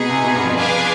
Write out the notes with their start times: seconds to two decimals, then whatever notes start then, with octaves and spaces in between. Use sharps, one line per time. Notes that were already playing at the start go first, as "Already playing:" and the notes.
Already playing: B2 B3 D#4 G#4
0.09 C3
0.24 B2
0.35 G2
0.45 F2
0.57 D4 G#4 B4 F5 G#5